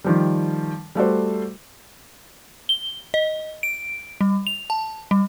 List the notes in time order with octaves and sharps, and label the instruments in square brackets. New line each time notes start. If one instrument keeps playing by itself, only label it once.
[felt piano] D#3 F3 G3
G3 A3 F#4 C5
[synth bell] G7
D#5
D7
G3
F7
A5
G3